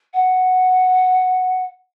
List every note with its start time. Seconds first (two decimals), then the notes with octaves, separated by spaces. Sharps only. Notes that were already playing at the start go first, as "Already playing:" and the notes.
0.13 F#5